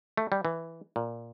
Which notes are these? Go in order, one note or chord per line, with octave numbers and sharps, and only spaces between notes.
A3
G3
E3
A#2